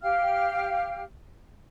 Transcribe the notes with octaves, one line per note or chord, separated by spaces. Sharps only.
G4 F5 G5 F6